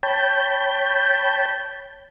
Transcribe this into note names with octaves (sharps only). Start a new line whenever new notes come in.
C#5 G5 A5 B5 G6